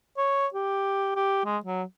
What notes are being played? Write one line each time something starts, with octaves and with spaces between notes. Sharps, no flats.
C#5
G4
G4
G#3
F#3